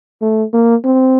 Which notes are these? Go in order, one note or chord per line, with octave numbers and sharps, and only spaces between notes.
A3
A#3
C4